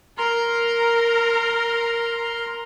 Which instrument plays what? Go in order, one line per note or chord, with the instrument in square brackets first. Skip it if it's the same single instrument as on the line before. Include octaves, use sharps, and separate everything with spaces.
[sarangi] A#4 [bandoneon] A#5 C6 F6